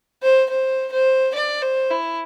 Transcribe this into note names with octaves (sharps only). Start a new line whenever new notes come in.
C5
C5
C5
D5
C5
E4